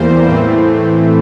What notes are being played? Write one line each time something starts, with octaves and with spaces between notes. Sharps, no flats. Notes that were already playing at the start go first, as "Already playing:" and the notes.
Already playing: E2 E3 G3 A#3 C5
A2 E3 A3 C4